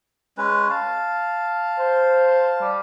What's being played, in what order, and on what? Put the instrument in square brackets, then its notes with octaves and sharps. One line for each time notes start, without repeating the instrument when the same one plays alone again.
[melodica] G#3 C#4 B4
F5 A5
[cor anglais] C5
G3